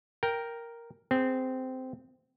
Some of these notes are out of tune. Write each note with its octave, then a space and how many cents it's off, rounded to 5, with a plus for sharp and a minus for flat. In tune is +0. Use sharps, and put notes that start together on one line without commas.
A#4 +0 G5 +0
C4 -15 G#4 +0